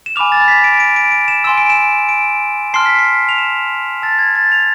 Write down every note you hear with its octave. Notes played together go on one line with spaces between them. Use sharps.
E7
G#5 B5 D6 F6 F7
A6
B6
D7
D7
D7
D7
E7
G#5 C6 E6 E7
D7
E7
D7
A5 C6 F6 C7
B6
C7
F7
E7
A5 E6 A6
G#6
A6
F7